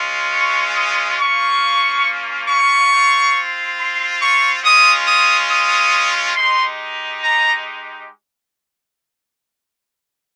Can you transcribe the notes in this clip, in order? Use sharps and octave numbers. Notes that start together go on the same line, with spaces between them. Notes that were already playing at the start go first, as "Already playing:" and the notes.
Already playing: G#3 C#4 F4
C#6
D#6
A#3 C#4 F4 C#6
C#6
C4 F4
C6
C#6
G#3 C#4 F4 D#6
D#6
D#6
G#3 D#4 G4 C6
A#5